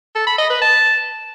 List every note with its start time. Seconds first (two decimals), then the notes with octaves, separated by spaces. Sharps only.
0.16 A4
0.27 B5
0.39 D#5
0.50 B4
0.62 A5